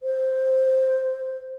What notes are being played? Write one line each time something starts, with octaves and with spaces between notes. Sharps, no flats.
C5